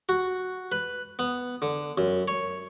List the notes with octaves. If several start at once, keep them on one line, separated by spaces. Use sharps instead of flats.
F#4
B4
B3
D3
F#2
C#5